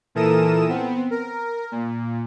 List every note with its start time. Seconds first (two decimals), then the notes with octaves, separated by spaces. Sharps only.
0.15 A#2 E3 A4 A#4 D#6 E7
0.69 B3 C4
1.11 A#4
1.72 A#2